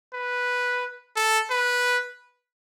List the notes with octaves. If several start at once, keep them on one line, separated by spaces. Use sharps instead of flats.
B4
A4
B4